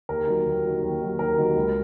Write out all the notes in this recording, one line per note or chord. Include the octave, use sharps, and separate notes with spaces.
D#2 A#4
D#3 F#3
D#2
D#3 F#3
D#2
D#3 F#3
D#2 A#4
D#3 F#3
C#2